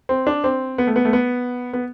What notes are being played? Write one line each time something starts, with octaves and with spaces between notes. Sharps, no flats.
C4
D4
C4
B3
A3
B3
A3
B3
B3